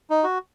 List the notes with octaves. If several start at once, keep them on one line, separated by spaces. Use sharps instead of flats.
D#4
F#4